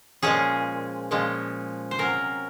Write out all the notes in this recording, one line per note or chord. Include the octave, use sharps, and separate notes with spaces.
A#2 F3 G#3 C#4 G#4
A#2 F3 G#3 C#4
C5
C3 F#3 C#4 A#4